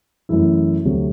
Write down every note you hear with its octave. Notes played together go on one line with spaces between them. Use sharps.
F#2 E3 A3 E4
D2 C3 F#3 A3